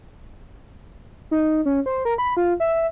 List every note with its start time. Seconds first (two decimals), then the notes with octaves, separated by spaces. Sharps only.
1.31 D#4
1.66 C#4
1.86 C5
2.05 A#4
2.18 B5
2.37 F4
2.60 E5